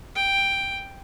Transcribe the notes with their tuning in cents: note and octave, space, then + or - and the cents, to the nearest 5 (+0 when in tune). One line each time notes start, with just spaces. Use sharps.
G5 +5